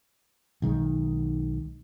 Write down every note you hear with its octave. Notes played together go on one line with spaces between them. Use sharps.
B1 D#3 G#3